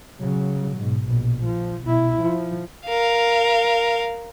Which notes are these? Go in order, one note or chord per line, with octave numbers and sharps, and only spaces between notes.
C#3 F#3
G#2 B2
A#1 B2
F3
B2 E4
F3
A#4 F5